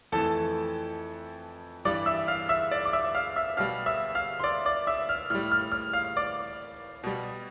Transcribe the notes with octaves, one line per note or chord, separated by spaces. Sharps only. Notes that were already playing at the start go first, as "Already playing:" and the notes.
F2 E3 A3 A4 A5
G2 E3 G3 D5 D6
E5 E6
F5 F6
E5 E6
D5 D6
D6
E5 E6
F5 F6
E5 E6
B2 G3 F5 F6
E5 E6
F5 F6
C6
D5 D6
D5 D6
E5 E6
F6
A2 G3 F6
F6
F6
F5 F6
D5 D6
B2 G3